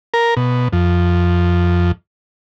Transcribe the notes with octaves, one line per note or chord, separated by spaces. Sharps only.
A#4
B2
F2